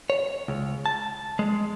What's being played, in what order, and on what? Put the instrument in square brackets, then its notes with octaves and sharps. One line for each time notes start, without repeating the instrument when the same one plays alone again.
[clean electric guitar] C#5
C#2
A5
G#3